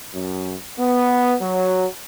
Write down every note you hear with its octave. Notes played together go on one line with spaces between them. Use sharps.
F#2
B3
F#3